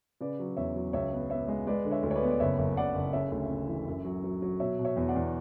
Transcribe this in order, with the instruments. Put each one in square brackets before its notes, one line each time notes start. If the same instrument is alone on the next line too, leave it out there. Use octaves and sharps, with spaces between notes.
[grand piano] C#3 B4 D5
F#3
E2 C#5 E5
F#3
C#2 C#5 E5
B3
B3 C#5 E5
G#3
G#3 B4 D5
D3
C#5 E5
D2
C#5
B4 D5
B3
D5
F#1 C#5 E5
F#1
F#1 D5 F#5
F#1
C#3 C#5 E5
D2
C#3
E3
F#2
F#3
F#3
F#3
B2 C#5 E5
B2
C#5 E5
E2
D5 F#5
E2